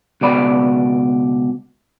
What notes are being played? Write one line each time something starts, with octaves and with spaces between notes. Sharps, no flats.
C#2 B2 D5 B5